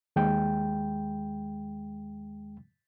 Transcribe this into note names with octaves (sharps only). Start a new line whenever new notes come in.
D#2 G#3 G5